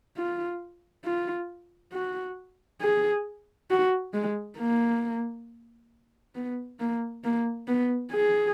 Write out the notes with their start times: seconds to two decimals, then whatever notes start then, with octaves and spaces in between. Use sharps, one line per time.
0.17 F4
1.05 F4
1.93 F#4
2.81 G#4
3.70 F#4
4.14 G#3
4.58 A#3
6.35 B3
6.80 A#3
7.24 A#3
7.68 B3
8.12 G#4